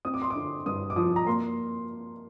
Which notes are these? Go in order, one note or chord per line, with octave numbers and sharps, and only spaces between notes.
C4 D#6
D6
C6
D6
D3
G2 D#6
D6
F3 D#6
A#5
A#3 C6